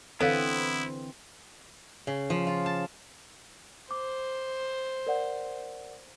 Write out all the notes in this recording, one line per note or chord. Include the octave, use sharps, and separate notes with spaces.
D3 E3 B3 C4 E4 A4 C#5 F5
C#3
F3
F4
A5
C5 D6
A#4 D5 F#5